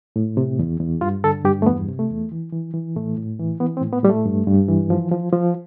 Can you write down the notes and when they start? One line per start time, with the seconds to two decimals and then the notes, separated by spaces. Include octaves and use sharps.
0.16 A2
0.37 C3
0.59 E2
0.80 E2
1.01 G2 F4
1.24 D3 A4
1.44 G2 G4
1.62 A3
1.66 E2 B3
1.89 C3
1.99 A3
2.10 E2
2.32 E3
2.52 E3
2.74 E3
2.96 A2 A3
3.18 A2
3.39 E3
3.60 E3 B3
3.77 C4
3.82 A2
3.93 B3
4.03 A2 G3
4.09 A3
4.26 G2
4.47 G2
4.68 E3
4.90 F3
5.12 F3
5.32 F3